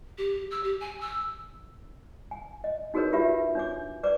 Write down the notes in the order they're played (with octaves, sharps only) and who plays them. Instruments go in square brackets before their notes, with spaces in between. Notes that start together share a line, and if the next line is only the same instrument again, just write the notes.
[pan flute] G4
E6
G4
G#5
E6
[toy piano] G#5
D#5
D#4 F#4 G#4 A#4 B4 C#5
F4 G4 B4 E5
D4 C#5 D6
B4 C5 D5 D6